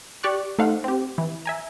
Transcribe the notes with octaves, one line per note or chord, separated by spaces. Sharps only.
G4 D5 C#6 F#6
A3 D#4 C5 F5 F#5
C4 G4
E3
E5 G#5 A#5